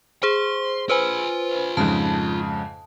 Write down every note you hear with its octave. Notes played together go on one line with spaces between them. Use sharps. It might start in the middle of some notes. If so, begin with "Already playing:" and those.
G#4 C5 C6
F4 B4 C5 G#5 B5
F2 G#2 C#3 A5